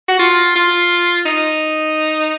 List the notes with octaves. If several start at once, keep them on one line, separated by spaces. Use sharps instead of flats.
F#4
F4
F4
D#4